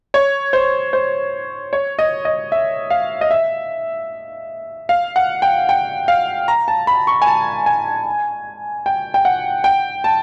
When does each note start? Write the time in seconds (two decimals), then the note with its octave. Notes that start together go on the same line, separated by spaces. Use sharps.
0.14 C#5
0.53 C5
0.93 C5
1.73 C#5
1.99 D#5
2.25 D#5
2.52 E5
2.90 F5
3.21 D#5
3.31 E5
4.89 F5
5.16 F#5
5.42 G5
5.69 G5
6.08 F5
6.48 A#5
6.68 A5
6.87 B5
7.07 C#6
7.22 G#5
7.27 A5
7.66 G#5
8.86 G5
9.14 G5
9.25 F#5
9.64 G5
10.04 A5